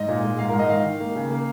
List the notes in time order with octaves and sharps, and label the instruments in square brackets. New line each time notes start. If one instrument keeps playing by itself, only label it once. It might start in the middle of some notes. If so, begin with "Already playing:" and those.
Already playing: [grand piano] G#2 D#5
A#2
G#3
G#2 F5
G#2 A#4
D#5
D#3 F5
D#3
A#3
C#3
A#3